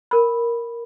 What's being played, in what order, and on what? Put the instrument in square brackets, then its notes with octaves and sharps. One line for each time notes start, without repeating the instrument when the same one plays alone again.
[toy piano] A#4 B5